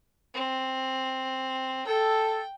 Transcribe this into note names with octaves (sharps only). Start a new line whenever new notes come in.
C4
A4 G5